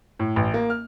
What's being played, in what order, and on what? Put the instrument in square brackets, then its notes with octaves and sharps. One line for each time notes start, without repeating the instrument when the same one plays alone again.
[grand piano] A2
A1
A#3
F6